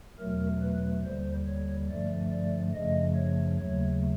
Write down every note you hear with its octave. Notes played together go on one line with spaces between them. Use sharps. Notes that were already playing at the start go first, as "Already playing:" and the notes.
E2 B2 F#3 A3 A#4
B4
D#2 D3 G3 C5
C#5
G2 D3 F3 A3 D5
D5
F#2 C#3 F3 A3 D#5
C#5
D#2 C#3 F#3 A3 C#5